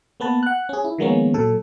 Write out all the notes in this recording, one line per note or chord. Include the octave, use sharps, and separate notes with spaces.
A#3 B3 B4 A5
F#5 F#6
C#4 G#4
E4
D#3 F3 G#3 A#3 B3 C#4
A#2 F#3 A4